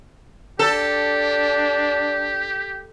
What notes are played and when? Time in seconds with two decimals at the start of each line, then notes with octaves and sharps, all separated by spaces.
0.59 D4 G4 A4